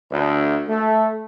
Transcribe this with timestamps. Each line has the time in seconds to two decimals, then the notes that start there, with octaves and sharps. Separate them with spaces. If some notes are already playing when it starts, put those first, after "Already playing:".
0.10 D2
0.68 A3